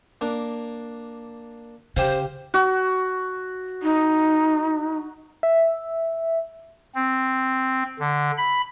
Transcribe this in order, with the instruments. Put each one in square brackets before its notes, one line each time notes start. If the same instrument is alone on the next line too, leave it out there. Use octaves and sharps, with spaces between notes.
[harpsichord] A#3 D4
[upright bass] C#3 [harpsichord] G4 F5 [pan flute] C5
[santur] F#4
[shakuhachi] D#4
[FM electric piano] E5
[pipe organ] C4
D3
B5